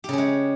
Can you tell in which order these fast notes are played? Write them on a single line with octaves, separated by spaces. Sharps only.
G4 C#3 C#4 G#3